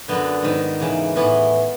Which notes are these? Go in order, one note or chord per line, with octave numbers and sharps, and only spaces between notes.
F#2 D3 B3
G#2 D#3 B3
E2 C#3 E3
A2 E3 B3